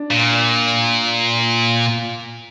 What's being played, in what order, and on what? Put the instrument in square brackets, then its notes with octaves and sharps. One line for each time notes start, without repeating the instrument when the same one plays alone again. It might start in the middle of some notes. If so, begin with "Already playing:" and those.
Already playing: [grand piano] D4
[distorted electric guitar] A#2